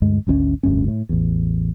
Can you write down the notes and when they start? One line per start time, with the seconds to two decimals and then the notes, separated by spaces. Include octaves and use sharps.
0.02 D2 G2 G#3
0.27 G#1 D2 C4 C#4
0.63 F1 D2 G2 C#4
0.88 A2
1.09 A1 E2